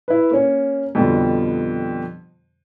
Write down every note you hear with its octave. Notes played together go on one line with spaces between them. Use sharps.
E4 B4
A#3 C#4
F2 B2 D3 F3 G3